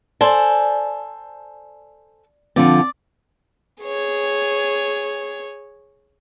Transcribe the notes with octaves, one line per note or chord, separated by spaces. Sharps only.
A4 C5 D5 G#5
D3 F3 C4 D5
G#4 C#5